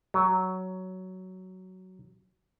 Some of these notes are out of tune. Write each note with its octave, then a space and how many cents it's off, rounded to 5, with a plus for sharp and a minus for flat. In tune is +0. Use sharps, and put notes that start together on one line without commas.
F#3 +10